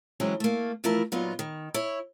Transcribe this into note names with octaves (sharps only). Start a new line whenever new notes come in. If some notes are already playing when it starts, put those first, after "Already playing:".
E3 F#3 G#3 C4 C#4
A3 A#3
E3 F3 A3 E4 A#4
A#2 F#3 B3 D#4 F4
D#3
E4 C#5